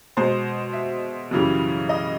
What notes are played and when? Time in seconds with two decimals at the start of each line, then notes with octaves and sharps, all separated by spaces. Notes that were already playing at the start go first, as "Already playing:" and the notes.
0.17 B2 G#3 C5
0.73 E5
1.31 F#2 C#3 E3 G3
1.89 D#5